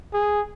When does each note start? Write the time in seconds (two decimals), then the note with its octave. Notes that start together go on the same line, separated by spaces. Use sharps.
0.14 G#4